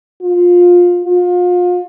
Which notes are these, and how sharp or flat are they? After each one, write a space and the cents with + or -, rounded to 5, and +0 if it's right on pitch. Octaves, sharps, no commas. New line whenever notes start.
F4 +20
F4 +35